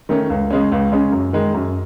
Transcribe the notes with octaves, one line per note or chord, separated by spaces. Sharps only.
D#3 A3 C#4
C#2
C#3 G#3 C#4
C#2
C#3 G#3 C#4
F#2
D#3 G#3
F#2